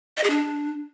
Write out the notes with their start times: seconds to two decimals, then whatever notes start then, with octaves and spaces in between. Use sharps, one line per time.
0.17 D#5
0.24 G#4
0.30 D4